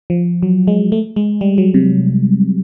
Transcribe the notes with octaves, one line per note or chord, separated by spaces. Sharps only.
F3
F#3
G#3
A3
G#3
G3
F#3
C3